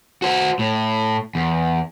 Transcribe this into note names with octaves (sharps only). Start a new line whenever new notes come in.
F#4 C5
A2
E2